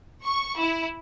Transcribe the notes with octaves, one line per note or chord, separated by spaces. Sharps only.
C#6
E4